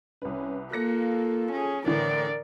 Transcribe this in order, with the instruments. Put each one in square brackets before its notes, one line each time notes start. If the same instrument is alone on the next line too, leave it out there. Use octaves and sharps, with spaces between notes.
[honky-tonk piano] C2 B4 [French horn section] C#4
[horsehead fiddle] A#3 [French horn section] F4 A4 [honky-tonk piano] F#6 A#6 C#7
[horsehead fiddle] C#4 G#4
[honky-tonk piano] A2 D3 E3 [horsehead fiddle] A#4 D5